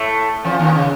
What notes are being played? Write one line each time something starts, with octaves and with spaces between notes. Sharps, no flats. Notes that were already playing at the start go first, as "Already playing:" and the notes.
Already playing: A2 A3
F2 F3
D#2 D#3
C#3